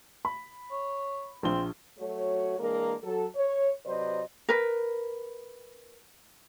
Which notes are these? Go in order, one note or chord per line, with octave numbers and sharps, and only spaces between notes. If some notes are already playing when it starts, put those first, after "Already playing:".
B5
C#5
A#1 F3 C4 G7
F#3 A3 F#4 C#5
E3 G#3 A#3 D4 A#4
F#3 A4
C#5
C3 F#3 B4 C5 D5 D#5
A#4 B4